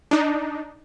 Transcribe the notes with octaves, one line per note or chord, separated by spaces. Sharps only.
D4 D#4